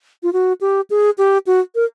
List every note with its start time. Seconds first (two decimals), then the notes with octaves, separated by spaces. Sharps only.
0.23 F4
0.33 F#4
0.61 G4
0.90 G#4
1.18 G4
1.47 F#4
1.75 A#4